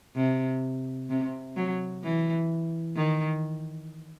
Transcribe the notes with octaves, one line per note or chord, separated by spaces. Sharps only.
C3
C3
F#3
E3
D#3